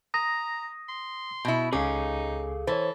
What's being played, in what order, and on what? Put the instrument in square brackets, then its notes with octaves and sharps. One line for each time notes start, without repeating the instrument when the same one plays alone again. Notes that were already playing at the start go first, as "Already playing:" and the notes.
[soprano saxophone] A#5 [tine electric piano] D#6 A#6
[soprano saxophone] C6
[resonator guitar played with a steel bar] B2 E4
[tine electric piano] C#2 D6 [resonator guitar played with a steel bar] C#4 [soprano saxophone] D#4 [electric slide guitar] G#4 A4 F5
[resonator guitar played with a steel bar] E3 [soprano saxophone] A4 [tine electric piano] C5 C#5